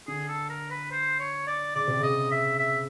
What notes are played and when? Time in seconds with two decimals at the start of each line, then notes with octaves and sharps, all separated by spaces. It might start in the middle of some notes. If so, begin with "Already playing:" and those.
0.07 D3 G#4
0.28 A4
0.50 A#4
0.70 B4
0.91 C5
1.19 C#5
1.47 D5
1.75 C#3 D5
1.88 C3
2.00 C#3 D#5
2.32 E5
2.59 E5